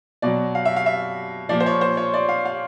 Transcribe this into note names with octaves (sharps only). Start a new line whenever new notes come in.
B2 F#3 D5
F5
E5
F5
E5
A#2 F3 D5
C5
C#5
C5
C#5
D5
F5
F5